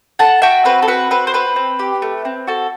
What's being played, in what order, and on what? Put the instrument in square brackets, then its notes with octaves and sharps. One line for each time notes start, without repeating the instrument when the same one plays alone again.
[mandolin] A4 F#5 A5
F#4 E5 G5
C4 B4
A4
F#4 B4
C4 B4
C5
C4 B4
C4
G4
A3
C4
F#4 A4